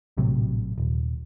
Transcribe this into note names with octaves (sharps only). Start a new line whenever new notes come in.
A#1 A2 C3 F#3
D#1